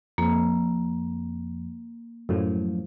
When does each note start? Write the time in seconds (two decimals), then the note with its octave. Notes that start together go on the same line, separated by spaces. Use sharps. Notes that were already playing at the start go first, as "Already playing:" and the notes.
0.18 F2 A#3
2.29 F#2 A2 F3